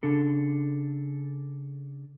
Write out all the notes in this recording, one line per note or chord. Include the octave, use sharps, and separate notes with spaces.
C#3 D4 A4